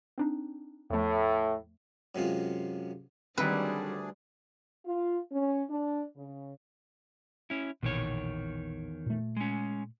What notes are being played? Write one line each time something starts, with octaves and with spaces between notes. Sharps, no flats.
C4 D4 D#4
E2 A2 F3 A3
F#2 C3 G#3 F4
D2 D#3 F#3 G3 C4 D4 G#4 B4
F4
C#4
D4
C#3
C#4 E4
A#1 E2 B2 D#3 C#5
A#2 A3
G#3 C#4